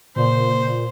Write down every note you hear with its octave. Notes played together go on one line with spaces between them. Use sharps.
A#2 C#3 C5